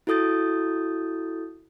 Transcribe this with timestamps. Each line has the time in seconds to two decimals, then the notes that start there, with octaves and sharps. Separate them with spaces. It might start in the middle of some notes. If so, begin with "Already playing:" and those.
0.07 E4 F#4 A4 D#6 G6 A6